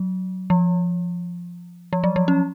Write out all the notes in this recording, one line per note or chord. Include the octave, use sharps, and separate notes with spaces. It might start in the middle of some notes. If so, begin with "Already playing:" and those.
Already playing: F#3
F3
F3
F#3
F3
C#4